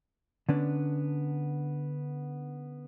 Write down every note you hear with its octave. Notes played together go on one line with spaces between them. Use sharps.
D3 B3 C#4 D4